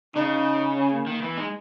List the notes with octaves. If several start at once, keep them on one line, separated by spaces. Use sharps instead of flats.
C#3 D#4
C#4
A#3
D#3 A#3
E3 B3
G#3 D#4